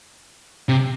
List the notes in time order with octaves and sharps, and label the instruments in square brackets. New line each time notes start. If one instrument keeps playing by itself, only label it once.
[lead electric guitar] C3